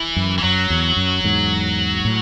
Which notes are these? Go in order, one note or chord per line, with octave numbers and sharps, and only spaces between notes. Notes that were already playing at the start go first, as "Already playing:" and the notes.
Already playing: E3
F#2
E3
F#2 F#3
E2
F#2
E2 G#2
A2